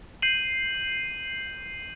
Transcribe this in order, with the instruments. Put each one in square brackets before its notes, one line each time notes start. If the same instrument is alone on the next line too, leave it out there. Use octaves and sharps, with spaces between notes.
[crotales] G6 C7 D#7 F#7